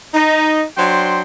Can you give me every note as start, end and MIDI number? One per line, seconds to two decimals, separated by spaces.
0.14 0.63 63
0.78 1.22 54
0.78 1.22 62
0.78 1.22 72
0.78 1.22 79
0.78 1.22 84